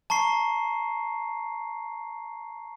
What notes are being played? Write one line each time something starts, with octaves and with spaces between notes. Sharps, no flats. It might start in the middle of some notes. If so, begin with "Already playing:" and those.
A5 A#5 C#6 C7